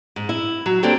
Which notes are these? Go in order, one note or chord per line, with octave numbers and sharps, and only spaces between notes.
G#2
E4
F#3
A#3 C4 D4 G4 A4 C#5